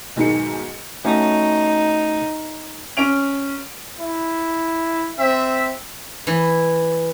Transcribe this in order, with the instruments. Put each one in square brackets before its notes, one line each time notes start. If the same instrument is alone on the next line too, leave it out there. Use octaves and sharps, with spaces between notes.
[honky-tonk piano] B1 G#2 D#3 G#4 C#7
[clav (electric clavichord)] A3 C#4 F#4 [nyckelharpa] D#4
[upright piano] C#4 D7 F7
[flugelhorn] E4
[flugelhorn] C4 [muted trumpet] E5
[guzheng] E3